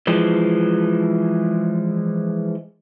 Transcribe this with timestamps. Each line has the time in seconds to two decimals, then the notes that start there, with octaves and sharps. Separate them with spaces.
0.07 E3 F3 G#3